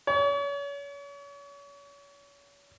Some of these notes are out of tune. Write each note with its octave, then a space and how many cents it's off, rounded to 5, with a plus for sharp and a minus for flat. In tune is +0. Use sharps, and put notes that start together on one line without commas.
C#5 +35